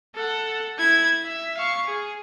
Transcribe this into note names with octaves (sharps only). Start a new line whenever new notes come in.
A4 F#5
E4 G#6
E5
F5 C#6
G#4